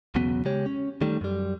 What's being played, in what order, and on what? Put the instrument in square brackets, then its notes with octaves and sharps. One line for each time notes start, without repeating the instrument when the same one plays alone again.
[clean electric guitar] B1 E2 C#3 F#3 B3
C#3 G#3 G4 C#5
C#4
D#3 G3 A3
F#2 G3